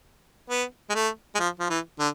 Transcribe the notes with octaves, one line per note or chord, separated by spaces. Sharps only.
B3
G#3
A3
G#3
F3
F3
E3
D3